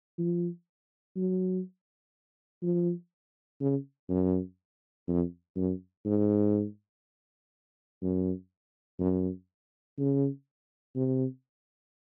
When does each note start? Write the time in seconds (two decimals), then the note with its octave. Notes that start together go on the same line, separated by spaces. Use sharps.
0.18 F3
1.16 F#3
2.62 F3
3.61 C#3
4.09 F#2
5.08 F2
5.56 F#2
6.06 G#2
8.02 F#2
8.99 F#2
9.98 C#3
10.96 C3